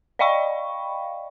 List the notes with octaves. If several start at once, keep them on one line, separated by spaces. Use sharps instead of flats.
D5 D#5 F5 G5 B5 C#6